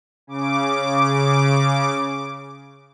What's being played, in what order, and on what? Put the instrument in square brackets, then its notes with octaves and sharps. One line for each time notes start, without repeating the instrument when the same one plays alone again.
[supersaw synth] C#3 D6